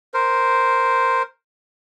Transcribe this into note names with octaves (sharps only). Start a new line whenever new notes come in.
A#4 C5